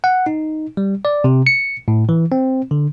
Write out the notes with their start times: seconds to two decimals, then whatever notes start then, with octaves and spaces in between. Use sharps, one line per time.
0.04 F#5
0.26 D#4
0.77 G3
1.05 D5
1.24 C3
1.47 C#7
1.88 A2
2.09 E3
2.32 C4
2.71 D3